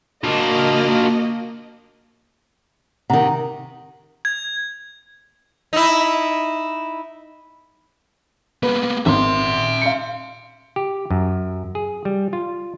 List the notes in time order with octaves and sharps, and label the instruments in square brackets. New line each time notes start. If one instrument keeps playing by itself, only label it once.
[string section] A#3 D#5 [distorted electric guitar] D4 F4 [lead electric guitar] F#4 A5
[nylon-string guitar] C3 D#3 [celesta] F#5 A#5
[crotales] G#6
[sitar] D#4 E4
[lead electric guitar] A#3 B3 [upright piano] B4
[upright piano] G#1 [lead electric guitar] E5 C6
[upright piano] F5 C#7
[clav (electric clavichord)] G4
F#2
G#4
G3
F4